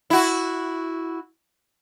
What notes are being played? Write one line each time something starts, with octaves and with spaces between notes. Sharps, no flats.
E4 F#4